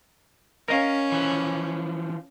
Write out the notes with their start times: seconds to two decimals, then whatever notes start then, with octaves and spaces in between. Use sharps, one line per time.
0.68 C#4 A#4 D#5 F5
1.12 E3 F3